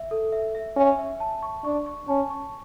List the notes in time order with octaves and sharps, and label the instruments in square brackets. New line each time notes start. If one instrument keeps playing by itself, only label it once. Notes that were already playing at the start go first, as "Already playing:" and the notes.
Already playing: [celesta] E5
A4
E5
E5
[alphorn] C#4 [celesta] E5
[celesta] E5
A5
C#6
[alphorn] D4 [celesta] C#6
[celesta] C#6
[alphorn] C#4 [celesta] A5
[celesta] C#6